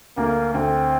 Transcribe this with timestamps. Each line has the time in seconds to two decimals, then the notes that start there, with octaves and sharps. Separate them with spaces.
0.17 D2 A#3
0.54 D2 C4